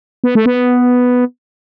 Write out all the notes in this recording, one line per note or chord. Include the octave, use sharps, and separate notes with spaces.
B3
A3
B3